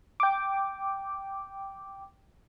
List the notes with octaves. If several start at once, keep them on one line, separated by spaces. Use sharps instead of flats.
G5 D6